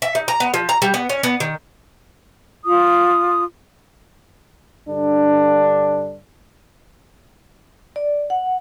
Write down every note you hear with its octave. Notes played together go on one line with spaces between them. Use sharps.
E5
D#4
A#5
B3
F3
A#5
G3
B3
C#4
B3
D#3
F4 D#6
G2 D3 D4
D5
F#5